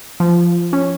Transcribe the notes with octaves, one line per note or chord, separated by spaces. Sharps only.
F3
C#4